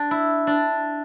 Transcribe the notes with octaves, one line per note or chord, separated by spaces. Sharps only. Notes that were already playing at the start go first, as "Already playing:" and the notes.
Already playing: D4
E4
D4